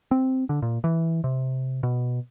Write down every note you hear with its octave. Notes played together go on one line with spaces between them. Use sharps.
C4
D3
A#2
E3
C3
B2